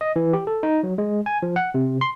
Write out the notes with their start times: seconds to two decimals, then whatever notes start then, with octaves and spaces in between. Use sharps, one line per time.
0.01 D#5
0.16 E3
0.33 G4
0.47 A4
0.63 D#4
0.83 F#3
0.98 G#3
1.26 G#5
1.43 F3
1.56 F#5
1.74 C3
2.01 C6